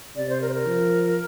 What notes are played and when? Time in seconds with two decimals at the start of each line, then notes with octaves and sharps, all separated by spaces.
0.16 C3 D5
0.30 C5
0.42 A#4
0.49 C5
0.54 A#4
0.66 F3